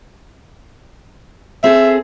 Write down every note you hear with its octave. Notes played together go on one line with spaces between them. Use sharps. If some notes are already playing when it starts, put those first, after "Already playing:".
C4 G#4 A4 E5